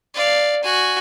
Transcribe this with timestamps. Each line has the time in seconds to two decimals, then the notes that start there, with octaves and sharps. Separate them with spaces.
0.14 D5 F5
0.63 F#4 G#5